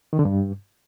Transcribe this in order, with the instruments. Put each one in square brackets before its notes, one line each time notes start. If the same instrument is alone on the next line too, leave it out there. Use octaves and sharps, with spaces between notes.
[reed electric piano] D#3
D3
G2